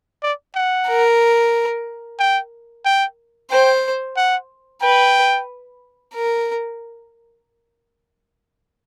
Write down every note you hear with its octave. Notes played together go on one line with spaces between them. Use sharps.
D5
F#5
A#4
G5
G5
C5 G5
F#5
B4 G5
A#4